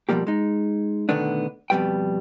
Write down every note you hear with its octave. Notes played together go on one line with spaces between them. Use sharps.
B2 D3 F3 G3 A#3 G4
G#3 D#4
B2 D3 D#3 A3 B3 D4
F2 B2 D#3 G3 B4 G5